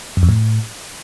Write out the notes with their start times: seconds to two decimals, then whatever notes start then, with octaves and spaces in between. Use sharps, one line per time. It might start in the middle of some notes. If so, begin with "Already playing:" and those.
0.17 F#2
0.23 F2
0.29 A2